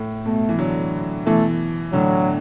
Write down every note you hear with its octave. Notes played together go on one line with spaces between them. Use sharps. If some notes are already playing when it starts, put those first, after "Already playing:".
Already playing: A2
B2 A3
E3
D3 F#3
B2 E3 A3
A2 D3 F#3